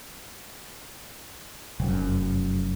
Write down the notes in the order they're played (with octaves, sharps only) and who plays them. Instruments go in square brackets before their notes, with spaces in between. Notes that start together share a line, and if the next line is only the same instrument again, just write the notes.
[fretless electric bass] F1 F#2